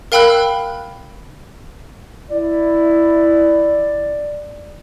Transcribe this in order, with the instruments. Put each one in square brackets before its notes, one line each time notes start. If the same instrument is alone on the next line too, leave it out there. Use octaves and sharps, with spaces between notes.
[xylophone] A#4 F5 G5 B5 E6 F#6
[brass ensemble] E4 [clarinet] D5